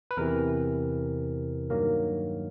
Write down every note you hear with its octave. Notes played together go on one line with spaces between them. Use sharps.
B4
E2 C3 E3 A#4
G2 D#3 F#3 A#3 A#4